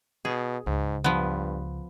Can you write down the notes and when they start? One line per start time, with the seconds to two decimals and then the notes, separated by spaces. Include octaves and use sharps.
0.25 B2 G#4
0.66 C#2 G#2
1.04 G2 F3 B3